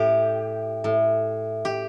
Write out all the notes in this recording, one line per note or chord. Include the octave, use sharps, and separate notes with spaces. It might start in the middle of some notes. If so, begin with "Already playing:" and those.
Already playing: A2 G4
A2
G4